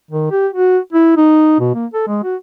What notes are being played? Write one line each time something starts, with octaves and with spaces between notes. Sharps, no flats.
D#3
G4
F#4
E4
D#4
B2
A#3
A4
G#3
F#4